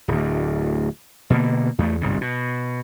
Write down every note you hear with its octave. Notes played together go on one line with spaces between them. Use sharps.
D1 D2
B2 D3 E3 A#3
E2 A3
G1 C2 G#2 C#3
B2